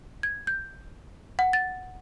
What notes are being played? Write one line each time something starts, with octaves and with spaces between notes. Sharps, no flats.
G#6
G6
F#5
A6